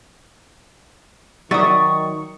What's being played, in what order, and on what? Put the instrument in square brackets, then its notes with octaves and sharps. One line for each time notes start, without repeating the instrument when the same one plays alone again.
[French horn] D#3 [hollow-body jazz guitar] F#3 D5 E5 [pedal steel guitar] C#6 [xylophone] D#6 A6